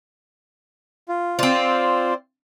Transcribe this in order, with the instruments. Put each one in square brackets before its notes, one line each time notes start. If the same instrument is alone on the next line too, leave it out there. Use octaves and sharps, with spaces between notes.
[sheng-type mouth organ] F4
[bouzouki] C4 F4 [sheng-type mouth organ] C5 D5